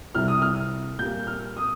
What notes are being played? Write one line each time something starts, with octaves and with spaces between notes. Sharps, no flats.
C2 C3 G3 F6
D#6
F6
A#2 G3 A#3 G6
F6
D#6